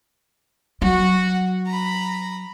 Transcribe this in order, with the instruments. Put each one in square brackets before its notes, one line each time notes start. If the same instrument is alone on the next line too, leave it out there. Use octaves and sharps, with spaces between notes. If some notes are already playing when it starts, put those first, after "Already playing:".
[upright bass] F#3 [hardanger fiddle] F#4 F#5
[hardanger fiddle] A#5 B5